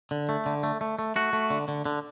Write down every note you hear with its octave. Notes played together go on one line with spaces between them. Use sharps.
D3
A3
D3
A3
A3
A3
A3 F#4
A3
D3
D3
D3